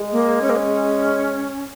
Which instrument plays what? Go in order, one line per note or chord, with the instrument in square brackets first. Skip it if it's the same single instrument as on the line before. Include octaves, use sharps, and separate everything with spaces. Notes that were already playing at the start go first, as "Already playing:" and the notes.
Already playing: [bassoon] G#3
[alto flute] A#3
C#4
A#3
C#4